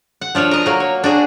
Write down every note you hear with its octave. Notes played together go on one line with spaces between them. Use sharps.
F#5
F3 D4 F4 C#5
A#4 D#5 A#5
F#3 A#3
C#5
D4 F#4 G#4